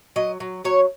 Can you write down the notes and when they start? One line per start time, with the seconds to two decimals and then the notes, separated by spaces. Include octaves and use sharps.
0.16 F#3 D#5
0.40 F#3
0.64 F#3 C#5